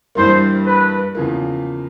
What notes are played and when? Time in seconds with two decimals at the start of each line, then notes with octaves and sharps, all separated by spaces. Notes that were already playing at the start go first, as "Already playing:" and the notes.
0.15 G2 E3 G3 A#3 C5
0.66 B4
1.15 E2 C#3 F3 A#3